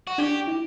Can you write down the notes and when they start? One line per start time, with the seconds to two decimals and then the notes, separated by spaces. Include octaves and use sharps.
0.07 F#4
0.18 D4 G4
0.47 E4